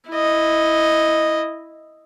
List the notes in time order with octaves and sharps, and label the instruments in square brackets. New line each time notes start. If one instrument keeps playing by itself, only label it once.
[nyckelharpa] E4 D#5